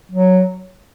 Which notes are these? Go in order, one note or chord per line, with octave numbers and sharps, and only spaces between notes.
F#3